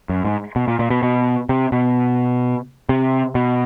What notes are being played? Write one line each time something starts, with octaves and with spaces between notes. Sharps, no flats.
F#2
G#2
B2
A#2
A#2
B2
B2
C3
B2
C3
B2